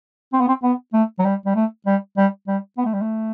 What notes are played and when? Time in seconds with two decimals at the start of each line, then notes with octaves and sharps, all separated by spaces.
0.33 C4
0.40 B3
0.48 C4
0.63 B3
0.93 A3
1.19 F#3
1.25 G3
1.46 G3
1.55 A3
1.86 G3
2.17 G3
2.48 G3
2.78 B3
2.85 A3
2.93 G3
3.01 A3